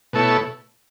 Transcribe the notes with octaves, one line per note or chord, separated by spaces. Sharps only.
B2 A3 E4 A4 C#5